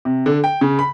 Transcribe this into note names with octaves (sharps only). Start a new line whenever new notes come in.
C3
D3
G5
C#3
B5